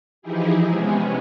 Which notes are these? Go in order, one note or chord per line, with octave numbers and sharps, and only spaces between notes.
E3 F3 D#4 E4 G4 G#4
C3 G#3 B3 C#4 G#4